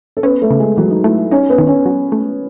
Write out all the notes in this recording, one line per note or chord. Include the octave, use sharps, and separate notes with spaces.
A4
B3 C#4 B4
A3 A4
C#3
G#3 G#4
E3 F#3 F#4
D#4
A3 E4
C#4 D#4 C#5
B3 B4
D#3
C#4 C#5
F#3
A3